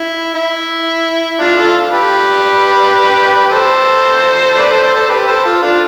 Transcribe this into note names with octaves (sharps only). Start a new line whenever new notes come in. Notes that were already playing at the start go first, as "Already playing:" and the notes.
Already playing: E4
E4
D4 F4
F4 A4
G4 B4
A4 C5
B4 D5
A4 C5
A4 C5
A4 C5
G4 B4
A4 C5
F4 A4
D4 F4